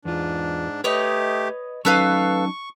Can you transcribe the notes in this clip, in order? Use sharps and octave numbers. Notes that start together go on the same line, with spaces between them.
E2 G#2 D4 F4
A3 G4 B4 C#5 D#5
F#3 C#4 D#4 A4 B4 F5 C#6